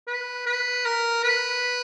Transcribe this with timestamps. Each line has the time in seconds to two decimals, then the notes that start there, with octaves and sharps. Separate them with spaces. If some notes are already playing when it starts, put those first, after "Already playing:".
0.07 B4
0.46 B4
0.85 A#4
1.24 B4